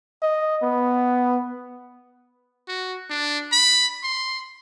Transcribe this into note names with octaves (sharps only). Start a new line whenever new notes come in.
D#5
B3
F#4
D4
B5
C6